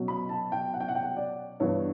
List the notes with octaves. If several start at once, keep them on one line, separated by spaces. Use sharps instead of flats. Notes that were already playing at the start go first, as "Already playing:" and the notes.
Already playing: B2 F#3 C#4
B5
A5
G5
F#5
G5
F#5
G5
F#5
D5
G2 E3 B3 C#5